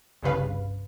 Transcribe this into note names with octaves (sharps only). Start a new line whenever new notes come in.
G1 C2 G2 C#3 B4 F5